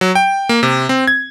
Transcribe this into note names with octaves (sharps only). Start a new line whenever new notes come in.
F#3
G5
A#3
C3
C4
G#6